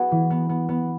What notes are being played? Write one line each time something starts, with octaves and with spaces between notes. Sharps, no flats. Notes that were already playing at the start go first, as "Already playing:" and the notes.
Already playing: B3 F#4 G#4 B4
E3
B3
B3
B3